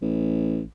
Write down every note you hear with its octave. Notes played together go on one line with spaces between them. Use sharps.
A1